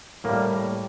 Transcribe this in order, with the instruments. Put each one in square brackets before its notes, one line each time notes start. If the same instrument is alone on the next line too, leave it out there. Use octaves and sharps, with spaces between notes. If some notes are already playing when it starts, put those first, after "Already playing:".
[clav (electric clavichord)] A2 G3 A#3